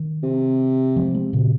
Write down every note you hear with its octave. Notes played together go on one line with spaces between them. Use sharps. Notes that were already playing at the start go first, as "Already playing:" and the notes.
Already playing: D#3
C3
F3 G#3
G#3 C4
A#2 C#3